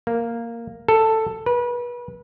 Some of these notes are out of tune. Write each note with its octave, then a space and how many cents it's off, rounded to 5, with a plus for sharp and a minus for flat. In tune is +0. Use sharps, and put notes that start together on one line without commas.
A#3 -5
A4 +10
B4 -30